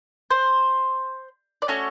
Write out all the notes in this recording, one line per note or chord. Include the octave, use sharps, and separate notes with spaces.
C5
D5
A3 C#4 F#4 A4 C#5